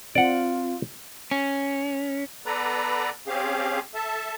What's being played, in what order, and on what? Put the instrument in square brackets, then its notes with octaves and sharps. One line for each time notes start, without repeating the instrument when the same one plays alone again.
[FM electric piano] C4 [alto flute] F4 [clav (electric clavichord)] D5 F#5
[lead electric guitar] C#4
[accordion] B3 A4 B4 D5 A#5
C4 C#4 G4 G#4 F5
A4 E5 A5